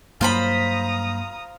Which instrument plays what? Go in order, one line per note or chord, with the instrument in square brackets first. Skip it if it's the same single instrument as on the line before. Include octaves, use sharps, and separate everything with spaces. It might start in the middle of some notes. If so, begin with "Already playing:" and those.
[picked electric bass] G2 F#3 A#3 [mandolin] F4 C5 B5 [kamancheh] A#5 D#6